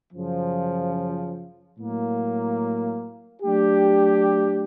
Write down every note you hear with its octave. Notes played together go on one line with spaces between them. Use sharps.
F#2 C#3 F3
A2 F#3 A#3
F#3 A3 D4 G4